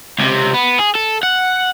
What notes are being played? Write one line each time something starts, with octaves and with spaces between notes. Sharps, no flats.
C#2 C3
B3
G#4
A4
F#5